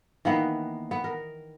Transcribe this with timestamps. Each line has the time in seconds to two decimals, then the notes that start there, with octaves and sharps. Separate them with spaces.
0.25 D#3 E3 A#3 B3
0.91 B3
1.04 A#4